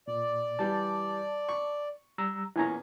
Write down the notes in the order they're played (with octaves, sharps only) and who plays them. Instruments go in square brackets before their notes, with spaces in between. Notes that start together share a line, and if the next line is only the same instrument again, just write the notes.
[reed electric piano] A#2 [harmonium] D5
[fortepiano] E3 G3 [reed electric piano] A5
[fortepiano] C#6
[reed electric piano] G3 A#5 E6
[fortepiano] E2 A#2 C#4 [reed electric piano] E4 G#5 A#5